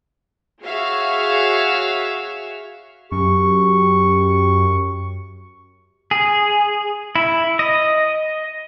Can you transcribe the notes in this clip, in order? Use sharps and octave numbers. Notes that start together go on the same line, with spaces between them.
F#4 G#4 C#5 E5 F5
F#2 G4 C#6
G#4
E4
D#5